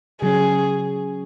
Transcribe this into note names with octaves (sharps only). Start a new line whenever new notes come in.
C#3 F#3 C#4 G#4